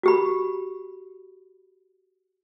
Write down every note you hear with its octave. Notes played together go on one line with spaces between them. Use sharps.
F#4 G4 B5